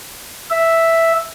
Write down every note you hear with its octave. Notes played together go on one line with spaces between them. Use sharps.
E5